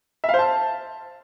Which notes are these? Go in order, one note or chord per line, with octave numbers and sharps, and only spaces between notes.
E5
F5
C5
A5